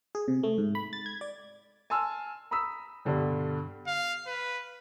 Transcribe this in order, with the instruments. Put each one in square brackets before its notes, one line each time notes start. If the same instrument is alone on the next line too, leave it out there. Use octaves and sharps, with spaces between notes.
[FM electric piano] G#4
C3
A3
G#2
B5
A6
G#6
D5
[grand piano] G#5 A5 C6 E6 F6
A#5 B5 D#6 E6 B6
G2 B2 D3 G3
[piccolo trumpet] F5
B4